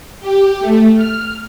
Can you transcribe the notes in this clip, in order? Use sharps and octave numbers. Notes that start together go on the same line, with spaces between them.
G4
A3
F6